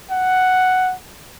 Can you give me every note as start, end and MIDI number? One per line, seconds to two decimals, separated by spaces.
0.10 0.94 78